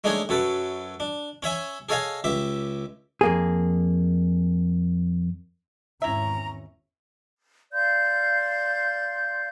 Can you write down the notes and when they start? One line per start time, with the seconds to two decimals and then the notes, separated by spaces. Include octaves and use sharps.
0.04 G#3 A3 D4 D#4 G#4 C#5
0.29 F#2 F#3 A4 B4
1.00 D4
1.43 C#4 C#5 E5 G#5
1.89 G#4 A4 C#5 D#5 F5 G#5
2.24 C#2 G4 E5
3.21 F2 A#3 G#4
6.02 G#1 E2 C#4 E4 E5 A#5
7.73 D5 F5 C6 G6